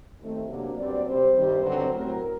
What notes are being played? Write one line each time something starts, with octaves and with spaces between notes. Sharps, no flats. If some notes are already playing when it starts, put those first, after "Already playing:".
D#2 D#3 A3 C4
C3 F#3 A#3 D4
G2 F#3 C4 D5
C3 G3 C4 C5
G2 D#3 G3 C4
G2 D3 F#3 C4 C5
A2 F#3 C4 A#4